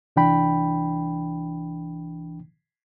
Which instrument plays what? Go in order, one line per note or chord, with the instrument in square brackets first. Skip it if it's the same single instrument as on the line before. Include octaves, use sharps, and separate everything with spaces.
[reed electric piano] C2 E3 D4 G5 B5